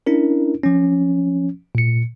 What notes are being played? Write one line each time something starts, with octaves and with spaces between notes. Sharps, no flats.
C#4 D4 E4 A#4
F3 C#4
A#2 C#7